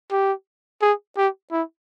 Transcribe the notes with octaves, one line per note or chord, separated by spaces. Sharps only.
G4
G#4
G4
E4